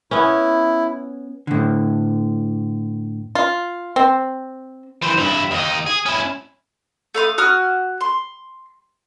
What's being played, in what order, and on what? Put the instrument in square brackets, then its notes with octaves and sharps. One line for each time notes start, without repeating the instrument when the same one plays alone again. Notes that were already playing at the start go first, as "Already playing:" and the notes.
[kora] B3 C#4 [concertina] E4
[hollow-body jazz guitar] A2 D3
[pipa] F4
C4
[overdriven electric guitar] E3 C5
G2 E4
D#2 D#4
G#4
C#4 E4
[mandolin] A3 F5 C6 D#6
F#4 D#6 F6
C6